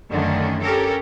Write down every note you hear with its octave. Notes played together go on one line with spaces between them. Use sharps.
F#2 D3 D#3 A3 C#4 D4
C#4 G4 A4 A#4